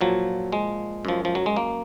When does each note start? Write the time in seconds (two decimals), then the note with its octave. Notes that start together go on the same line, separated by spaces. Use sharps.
0.01 A#2 F3 F#3
0.52 G#3
1.05 F#2 F3
1.25 F3
1.35 F#3
1.46 G#3
1.56 A#3